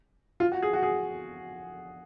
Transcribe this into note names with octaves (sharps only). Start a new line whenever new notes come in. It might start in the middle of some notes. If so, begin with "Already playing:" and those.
F4
F#4
G#4
F#4
G#4